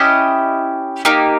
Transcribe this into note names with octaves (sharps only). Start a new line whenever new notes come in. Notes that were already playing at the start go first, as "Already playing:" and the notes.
Already playing: C#4 E4 G4 D#5
A#3 D#4 G4